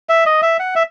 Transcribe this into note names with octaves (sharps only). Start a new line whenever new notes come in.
E5
D#5
E5
F#5
E5